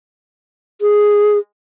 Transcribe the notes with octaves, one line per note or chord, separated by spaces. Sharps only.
G#4